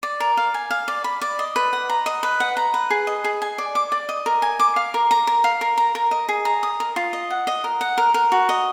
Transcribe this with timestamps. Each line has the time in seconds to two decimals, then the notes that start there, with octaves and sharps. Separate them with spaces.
0.03 D5
0.20 A#4
0.37 F5
0.54 G#5
0.71 F5
0.88 D5
1.04 B5
1.21 D5
1.39 D#5
1.56 B4
1.73 F#5
1.89 A#5
2.06 D#5
2.23 B4
2.40 F#5
2.57 A#5
2.74 B4
2.90 G#4
3.07 D#5
3.24 G#4
3.42 G#5
3.58 D5
3.75 D6
3.92 D5
4.09 D#5
4.26 A#4
4.42 G#5
4.60 D6
4.76 F5
4.94 A#4
5.11 A#5
5.27 A#4
5.44 F5
5.61 A#4
5.78 A#5
5.95 A#4
6.11 D#5
6.29 G#4
6.45 A#5
6.63 D#6
6.80 A#4
6.96 F4
7.13 D#5
7.30 F#5
7.47 D#5
7.64 A#4
7.81 F#5
7.98 A#4
8.14 A#4
8.32 F#4
8.49 D#5